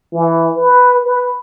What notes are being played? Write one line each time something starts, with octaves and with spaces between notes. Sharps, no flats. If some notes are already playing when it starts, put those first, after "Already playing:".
E3
B4
B4